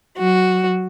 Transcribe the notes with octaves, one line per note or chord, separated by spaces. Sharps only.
F#3 F#4